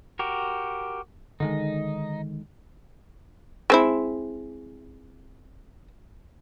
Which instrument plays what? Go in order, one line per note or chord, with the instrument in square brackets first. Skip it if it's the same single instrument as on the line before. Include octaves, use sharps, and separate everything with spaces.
[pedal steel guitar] F#4 G4 A#4
[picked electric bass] D3 D#3 G#3 [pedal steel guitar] D#4
[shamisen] G#3 C4 E4